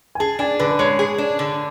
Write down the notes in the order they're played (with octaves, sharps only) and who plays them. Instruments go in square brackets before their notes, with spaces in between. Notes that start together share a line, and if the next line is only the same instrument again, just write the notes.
[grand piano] G#5
[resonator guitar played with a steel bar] G#4 [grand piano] A5
[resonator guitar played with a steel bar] D4 [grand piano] G#5
[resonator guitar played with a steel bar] D3 [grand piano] B4
[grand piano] B4
[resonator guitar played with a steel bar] G#3 [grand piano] C#5
[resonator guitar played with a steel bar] G#4
D4
D3